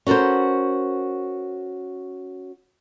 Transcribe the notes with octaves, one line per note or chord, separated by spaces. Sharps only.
C#4 F#4 A4 A#4 C5